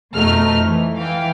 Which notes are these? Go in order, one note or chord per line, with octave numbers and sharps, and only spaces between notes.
F2 B2 A3 D#4 F6
E3
E3 F5 G5